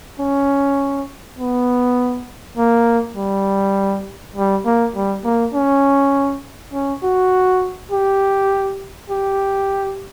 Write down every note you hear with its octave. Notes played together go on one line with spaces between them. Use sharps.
C#4
B3
A#3
G3
G3
A#3
G3
A#3
C#4
C#4
F#4
G4
G4